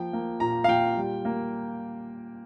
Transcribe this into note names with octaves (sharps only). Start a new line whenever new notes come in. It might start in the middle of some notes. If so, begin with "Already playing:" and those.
Already playing: F3 A#3 G5
A#3
A#2 A#5
F5
A#2 G5
G3
A#3